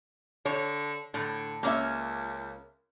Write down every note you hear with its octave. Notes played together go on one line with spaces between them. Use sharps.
D3 C#5
A2 D3
C#2 A#3 C#4 E5